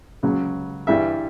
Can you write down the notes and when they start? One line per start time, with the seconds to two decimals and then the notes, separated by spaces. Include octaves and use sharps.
0.23 C#2 C#3 F#3
0.87 G2 E3 G3 E5